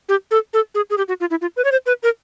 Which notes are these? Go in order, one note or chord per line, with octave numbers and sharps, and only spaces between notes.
G4
A4
A4
G#4
G#4
G4
F#4
F4
E4
F4
B4
C#5
C5
B4
A#4